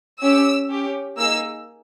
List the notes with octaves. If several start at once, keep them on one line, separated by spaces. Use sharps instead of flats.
C#4 G4 E6
C#4 G4
A#3 D#4 G#4 E6